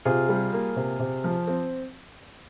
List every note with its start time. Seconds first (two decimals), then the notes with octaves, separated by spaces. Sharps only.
0.05 C3 F4 G#4
0.29 G3
0.53 A#3
0.76 C3
0.99 C3
1.24 F3
1.47 C4